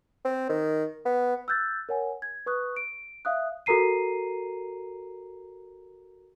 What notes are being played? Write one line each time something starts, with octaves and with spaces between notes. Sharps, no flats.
C4
D#3
B3
E6 F#6 G6 A6
A#4 C#5 F#5 G#5
G#6
B4 C#6 D#6 F#6
D7
E5 F5 D#6 F#6
F#4 A4 A#4 A#5 C7 D#7